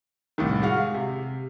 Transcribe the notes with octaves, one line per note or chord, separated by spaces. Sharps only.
C2 A2 D#3
G#3 F#4 F5
C3